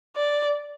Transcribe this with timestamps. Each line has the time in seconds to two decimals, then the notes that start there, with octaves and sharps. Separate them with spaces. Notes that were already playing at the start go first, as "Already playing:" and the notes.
0.16 D5